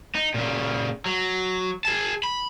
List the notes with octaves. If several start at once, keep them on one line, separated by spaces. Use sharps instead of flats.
D#4
A#2 C#3
F#3
G#4 A5
B5